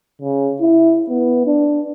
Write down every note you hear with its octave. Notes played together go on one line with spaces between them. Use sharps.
C#3
E4
B3
D4